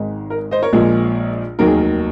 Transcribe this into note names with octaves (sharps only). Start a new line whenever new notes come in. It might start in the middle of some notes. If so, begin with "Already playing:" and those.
Already playing: G#1 G#2 D#3 G#3
A#4
C5 D#5
A#4 C#5
A#1 A#2 F3 G#3
F1 D#2 D#3 F#3 A#4
G#4
A#4